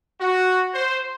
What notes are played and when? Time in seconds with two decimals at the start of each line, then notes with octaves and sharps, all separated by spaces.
0.20 F#4
0.74 C5